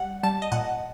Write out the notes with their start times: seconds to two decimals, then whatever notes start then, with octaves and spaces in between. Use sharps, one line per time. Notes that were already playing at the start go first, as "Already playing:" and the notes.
Already playing: G3 F#5
0.23 G3 A5
0.42 D#5
0.52 A#2 F#5